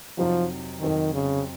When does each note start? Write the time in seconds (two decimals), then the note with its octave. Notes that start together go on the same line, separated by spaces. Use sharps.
0.18 F2 C3 F3 F#3 C4 D#4
0.81 F2 C3 D#3 F#3 C4 D#4
1.14 C#3